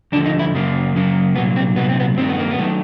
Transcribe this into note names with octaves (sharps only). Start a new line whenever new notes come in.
D#2 D3 F3 A3 D4
D#4
E4
F#2 C#3 F#3 A#3
F#2 C#3 F#3 A#3
C2 A#2 F#3 B3
C4
C2 A#2 F#3 B3
C4
B3
G2 D#3 F#3 A3 C4
B3
A#3
B3
D#3 F#3 A3